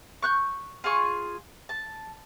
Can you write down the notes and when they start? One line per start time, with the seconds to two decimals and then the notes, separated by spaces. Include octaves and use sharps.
0.22 C#6 F#6 G6
0.84 F4 G#4 G#5 C#6
1.69 A5